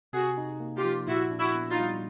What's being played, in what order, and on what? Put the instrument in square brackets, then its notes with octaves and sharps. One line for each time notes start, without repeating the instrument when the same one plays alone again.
[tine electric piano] C3 [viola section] F#4 G#4
[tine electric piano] D#4
A#3
[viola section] F4 G4
[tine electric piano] F3
[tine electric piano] A#2 [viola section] E4 F#4
[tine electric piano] D4
[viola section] E4 F#4
[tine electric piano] B3
[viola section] D#4 F4
[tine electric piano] G3